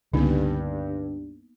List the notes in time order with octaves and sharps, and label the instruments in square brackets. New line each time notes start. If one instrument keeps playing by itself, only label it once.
[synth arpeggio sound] C#2 [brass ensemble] G2 [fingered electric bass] D3 [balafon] A#3 B3 D#4